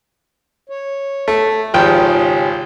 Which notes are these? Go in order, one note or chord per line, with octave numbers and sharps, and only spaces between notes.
C#5
A3
G#1 C#3 F3 G4 G#4 G5